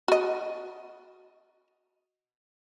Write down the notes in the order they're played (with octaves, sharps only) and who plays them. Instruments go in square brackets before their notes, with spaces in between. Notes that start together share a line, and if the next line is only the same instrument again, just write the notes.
[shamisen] F#4 D#5